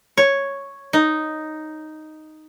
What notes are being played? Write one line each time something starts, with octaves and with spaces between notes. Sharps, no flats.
C#5
D#4